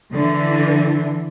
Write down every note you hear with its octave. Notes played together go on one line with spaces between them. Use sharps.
D3 E3